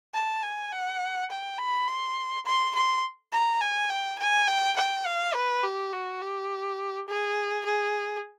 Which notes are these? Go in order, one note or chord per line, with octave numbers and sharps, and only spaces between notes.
A5
G#5
F#5
G5
B5
C6
C6
C6
A#5
G#5
G5
G#5
G5
G5
F5
B4
G4
F#4
G4
G#4
G#4